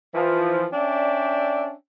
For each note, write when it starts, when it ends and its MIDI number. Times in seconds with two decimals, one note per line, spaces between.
0.15 0.66 52
0.15 0.66 53
0.73 1.73 61
0.73 1.73 62
0.73 1.73 74
0.73 1.73 76
0.73 1.73 79